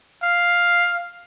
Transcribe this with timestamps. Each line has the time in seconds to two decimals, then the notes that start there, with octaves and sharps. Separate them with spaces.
0.23 F5